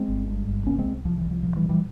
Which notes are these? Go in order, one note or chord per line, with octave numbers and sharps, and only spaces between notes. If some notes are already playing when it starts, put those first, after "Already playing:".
Already playing: G#3 C4
G1
G2
G1
C2 A#3 C#4
G#3 C4
C2
C2 F3
E3
C2
F3
A#2 F3
E3 G3
A#2
E3 G3